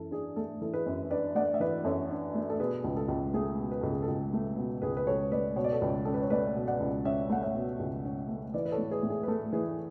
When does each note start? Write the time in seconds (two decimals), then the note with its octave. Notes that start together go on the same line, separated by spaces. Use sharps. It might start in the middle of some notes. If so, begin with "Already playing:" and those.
Already playing: F#2 E3 A4
0.11 D4 G#4
0.36 A3 A4
0.61 E3 A4
0.74 G#4 B4
0.86 F#2
1.10 D4 B4 D5
1.35 A3 D5 F#5
1.54 E5
1.60 E3 B4 D5
1.84 F#2 A4 C#5
2.10 D4
2.35 A3
2.50 A4
2.60 B2 G#4 B4
2.84 C#2
2.97 A4
3.08 C#2
3.34 A3 G#4
3.59 B2
3.71 B4
3.81 C#2 A4
3.92 G#4
4.02 A4
4.08 C#2
4.33 A3
4.57 B2
4.82 C#2 G#4 B4
4.97 B4
5.07 C#2 A4 C#5
5.32 A3 B4 D5
5.56 B2 C#5
5.64 D5
5.72 A4 C#5
5.82 C#2
6.05 C#4 A4
6.14 B4
6.22 C#5
6.30 A3 B4 D5
6.55 B2
6.67 D5 F#5
6.80 C#2
7.05 C#4 C#5 E5
7.30 A3 F#5
7.43 C#5 E5
7.55 B2
7.80 C#2
8.05 C#4
8.28 A3
8.54 E3 B4 D5
8.65 B4
8.72 A4 C#5
8.78 A2
8.91 G#4 B4
9.03 A2
9.10 G#4
9.23 B4
9.28 A3 A4
9.52 E3 G#4 B4